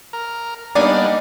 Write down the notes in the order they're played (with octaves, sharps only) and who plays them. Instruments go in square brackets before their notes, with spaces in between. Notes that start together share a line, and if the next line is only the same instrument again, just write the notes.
[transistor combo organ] A#4
[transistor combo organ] G3 A#3 B3 [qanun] D4 D#4 G#5 [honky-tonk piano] D5